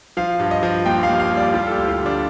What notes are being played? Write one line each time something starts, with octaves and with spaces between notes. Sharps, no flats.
F3 F5
G2
D#5
F3
D#2 G5
F5
D#2
F5
G3
D5
G3 F4
A4
G4
D2
F4
D3
D4